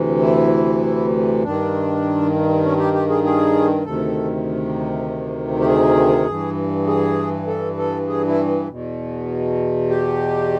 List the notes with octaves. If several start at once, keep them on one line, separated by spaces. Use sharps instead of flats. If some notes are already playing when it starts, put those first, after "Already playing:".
Already playing: D2 C3 E3
E4
G2 D#3 D4
C#4
G4
G4
G#4
G#4
D2 C3 D#3 A4
G4
G#4
G2 E3
G#4
A4
A4
G#4
E4
E2 B2
G4